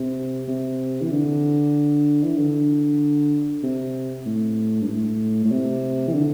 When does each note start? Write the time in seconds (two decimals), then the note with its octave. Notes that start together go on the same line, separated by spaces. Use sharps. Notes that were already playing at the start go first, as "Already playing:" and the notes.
Already playing: C3
0.48 C3
1.01 E3
1.12 D3
2.24 E3
2.37 D3
3.63 C3
4.26 A2
4.82 G2
4.88 A2
5.44 A2
5.51 C3
6.08 E3
6.14 D3